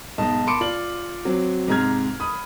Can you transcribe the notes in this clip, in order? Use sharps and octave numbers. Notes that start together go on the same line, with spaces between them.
B1 G#2 D#5 A5
A5 B5 C6 D6 C#7 D7
F4 D5 F#7
F#3 C4
G#2 C3 G#3 A#5 F6 G#6
B5 D#6